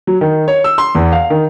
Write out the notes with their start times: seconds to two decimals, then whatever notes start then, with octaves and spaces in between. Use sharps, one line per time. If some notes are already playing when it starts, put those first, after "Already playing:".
0.07 F#3
0.21 D#3
0.48 C#5
0.64 E6
0.78 C6
0.95 E2
1.12 F5
1.30 D#3